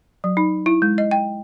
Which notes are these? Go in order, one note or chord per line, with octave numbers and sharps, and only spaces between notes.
F#3
D#4
E4
G#3
D#5
G5